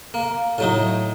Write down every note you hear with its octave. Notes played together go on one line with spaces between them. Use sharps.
A#3
A2 F#3 D#4